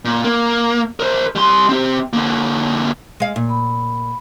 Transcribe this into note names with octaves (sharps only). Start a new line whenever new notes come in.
A#2
A#3
A#4 C5
G3 C6
C4 G4
D3 A#3
G#3 F5
A#2
B5